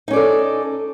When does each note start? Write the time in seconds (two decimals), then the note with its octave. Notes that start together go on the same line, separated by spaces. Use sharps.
0.08 D#4
0.11 C#4
0.13 D5
0.16 A4